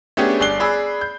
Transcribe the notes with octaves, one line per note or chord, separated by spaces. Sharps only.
A3 B3 C#4 D4 G4 G#4
G1 D5 F#6 C7 G7
G#4 D5 B5 E6
G6